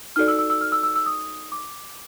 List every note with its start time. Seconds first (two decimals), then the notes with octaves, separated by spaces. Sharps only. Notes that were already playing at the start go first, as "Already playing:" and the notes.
0.16 D#4 F#4 A4 D5 F6
0.28 E6
0.39 E6
0.50 E6
0.61 F6
0.72 E6
0.83 E6
0.96 E6
1.06 D#6
1.52 D6